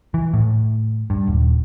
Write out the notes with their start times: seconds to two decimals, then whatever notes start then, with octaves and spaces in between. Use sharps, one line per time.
0.14 E3
0.33 A2
1.10 G2
1.27 D#1